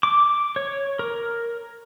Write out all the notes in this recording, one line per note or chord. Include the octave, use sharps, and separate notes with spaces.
D6
C#5
A#4